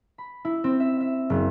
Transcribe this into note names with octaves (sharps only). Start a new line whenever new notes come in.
B5
E4
C4
E5
E5
F#1